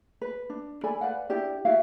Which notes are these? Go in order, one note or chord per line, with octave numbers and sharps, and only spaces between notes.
B4
D4
A4 D5 G#5 B5
B4 D5 F5 F#5
D4 E4 G4 D5
E4 F#4 G4 F5